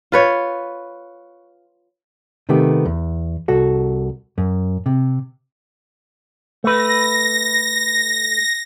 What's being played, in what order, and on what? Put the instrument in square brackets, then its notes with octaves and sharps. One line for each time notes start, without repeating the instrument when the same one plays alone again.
[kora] F4 B4 C#5
[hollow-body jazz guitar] C3 D#3 A3 B3 G4
E2
C2 F#4 A4
F#2
C3
[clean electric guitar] A3 B4 [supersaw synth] A#6